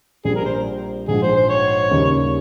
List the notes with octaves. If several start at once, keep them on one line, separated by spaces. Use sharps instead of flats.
A#1 A#2 G3 C4 G#4
A#4
C5
A#1 G#2 F3 G#4
C5
C5
C#5
D#2 C#3 G3 C#4